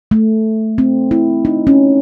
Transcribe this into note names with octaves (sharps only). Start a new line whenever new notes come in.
A3
C4
E4
D#4
C#4